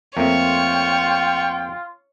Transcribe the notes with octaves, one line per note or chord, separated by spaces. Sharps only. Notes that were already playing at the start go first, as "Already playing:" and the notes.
F2 A3 A#3 F4 C#5 G5